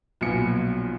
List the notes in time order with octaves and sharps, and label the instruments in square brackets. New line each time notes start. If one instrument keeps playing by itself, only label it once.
[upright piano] B1 A#2 F3 B3 G#5 C#7